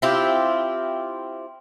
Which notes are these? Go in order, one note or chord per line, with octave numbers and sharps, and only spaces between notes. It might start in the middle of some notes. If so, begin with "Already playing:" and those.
C4 E4 F4 G4